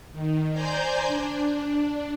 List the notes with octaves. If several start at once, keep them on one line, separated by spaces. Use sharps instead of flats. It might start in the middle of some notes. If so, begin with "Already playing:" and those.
D#3
C5 D5 G#5 A#5 G6
D4